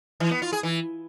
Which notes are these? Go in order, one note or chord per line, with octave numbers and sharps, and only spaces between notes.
E3
B3
F4
G#4
E3